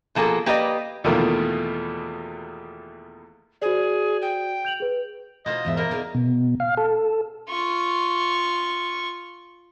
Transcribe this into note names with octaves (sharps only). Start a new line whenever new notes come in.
B2 F3 A#3 G#4 A4
A#3 G4 B4 D5 D#5
E2 B2 D#3 F3 A3 A#3
F#4 G#4 C5 D5
G5
G6 F7 F#7
G#4 B4
B2 D#4 F4 C5 D#5
E2 G#2 E5
B2 A#3 A#4 D#5
B3 D#4 G#4 D5
B2
F5
A4
F4 C#6